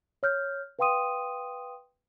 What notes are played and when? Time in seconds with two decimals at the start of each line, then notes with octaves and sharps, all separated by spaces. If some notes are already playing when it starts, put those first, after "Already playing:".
0.23 C#5 F6 G6
0.79 B4 F5 G5 C6 D#6 D#7